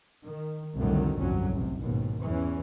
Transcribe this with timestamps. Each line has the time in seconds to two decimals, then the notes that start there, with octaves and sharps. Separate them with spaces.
0.22 D#3
0.77 C2 F2 A2 D3 D#3 F#3
1.16 G1 C2 F2 F#3 C#4
1.51 A1 C3
1.79 D#2 G#2 B2
2.21 E2 E3 C#4